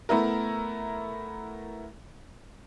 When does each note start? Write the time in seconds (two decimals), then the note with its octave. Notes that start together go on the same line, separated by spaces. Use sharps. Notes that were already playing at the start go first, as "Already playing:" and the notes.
0.09 A3 B3 E4 A#4